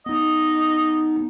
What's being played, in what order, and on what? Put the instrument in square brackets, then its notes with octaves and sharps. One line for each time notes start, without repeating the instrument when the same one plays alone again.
[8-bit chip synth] B3 D#4 [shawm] D#5